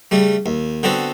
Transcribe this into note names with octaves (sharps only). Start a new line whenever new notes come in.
C#3 G3 A3
D#2
D3 B3 C4 F#4 A4